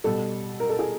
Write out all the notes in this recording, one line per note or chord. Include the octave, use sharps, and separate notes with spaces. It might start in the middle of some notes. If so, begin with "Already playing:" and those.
B2 G3 A4
A#4
A4
G#4